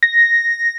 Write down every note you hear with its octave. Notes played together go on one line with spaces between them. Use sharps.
A#6